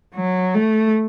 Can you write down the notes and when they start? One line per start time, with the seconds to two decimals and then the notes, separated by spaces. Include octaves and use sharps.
0.15 F#3
0.55 A3